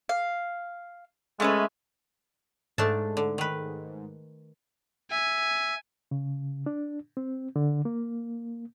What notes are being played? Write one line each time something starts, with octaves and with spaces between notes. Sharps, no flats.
F5
G#3 A3 C#4 B4
G#2 A3 D4 A5
D3
D#3 B4
E5 G#5
C#3
D4
C4
D3
A#3